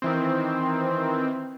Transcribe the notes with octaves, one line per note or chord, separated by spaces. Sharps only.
D#3 E3 C4